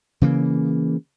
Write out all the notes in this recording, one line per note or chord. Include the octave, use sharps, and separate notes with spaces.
C#3 E3 A#3